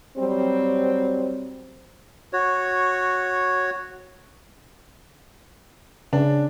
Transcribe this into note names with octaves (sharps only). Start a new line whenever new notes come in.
F#3 G3 C4
F#4 C#5
C#3 D4